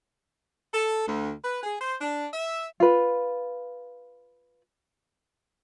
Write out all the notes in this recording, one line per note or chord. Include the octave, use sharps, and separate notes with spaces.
A4
D2
B4
G#4
C5
D4
E5
F4 B4